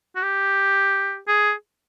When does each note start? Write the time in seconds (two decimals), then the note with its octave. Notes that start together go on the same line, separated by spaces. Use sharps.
0.16 F#4
0.23 G4
1.28 G#4